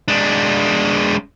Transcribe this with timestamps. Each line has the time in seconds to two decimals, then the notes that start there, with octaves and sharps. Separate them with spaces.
0.08 G#3 D4